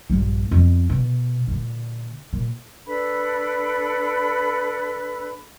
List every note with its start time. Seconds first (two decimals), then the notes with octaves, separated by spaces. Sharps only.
0.10 A#1 G2
0.51 F2 B3
0.90 B2
1.48 A#2 D3
2.33 A#2
2.87 D4 A4 B4 B5